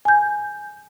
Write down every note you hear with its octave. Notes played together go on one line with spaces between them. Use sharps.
G#5 G6